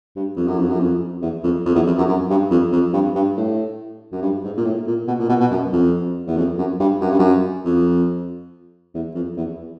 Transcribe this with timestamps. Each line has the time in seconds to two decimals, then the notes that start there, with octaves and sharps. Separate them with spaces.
0.16 G2
0.37 F2
0.48 F#2
0.59 F2
0.69 F#2
0.80 F2
1.22 E2
1.44 F2
1.66 F2
1.75 E2
1.87 F2
1.98 F#2
2.09 F#2
2.30 G2
2.51 F2
2.73 F2
2.93 G2
3.16 G2
3.37 A2
4.12 F#2
4.22 G2
4.44 G#2
4.57 A#2
4.65 A2
4.87 A#2
5.08 B2
5.19 A#2
5.29 B2
5.40 B2
5.51 F#2
5.73 F2
6.27 E2
6.37 F2
6.58 F#2
6.80 G2
7.01 F#2
7.11 G2
7.19 F#2
7.65 F2
8.94 E2
9.15 F2
9.37 E2